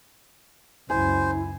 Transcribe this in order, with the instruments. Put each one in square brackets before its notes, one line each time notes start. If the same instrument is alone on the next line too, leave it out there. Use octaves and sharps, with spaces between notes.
[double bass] C#2 F#2 [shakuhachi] E4 [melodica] C5 [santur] G#5